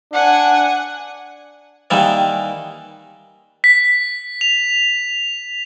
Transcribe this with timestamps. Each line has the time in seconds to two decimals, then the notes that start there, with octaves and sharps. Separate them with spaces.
0.14 D4 F#5 G#5
1.90 D#3 E3 G3 A#3
3.64 B6
4.41 F7